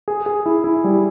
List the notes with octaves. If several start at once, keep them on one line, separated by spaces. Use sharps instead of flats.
G#4
G#4
E4
E4
G3